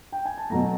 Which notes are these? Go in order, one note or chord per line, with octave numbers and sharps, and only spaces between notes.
G5
G#5
A5
B2 F#3 A3 A#5